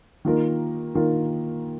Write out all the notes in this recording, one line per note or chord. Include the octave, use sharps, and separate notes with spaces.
D#3 A#3 F4 A#4
D#3 A#3 F4 A#4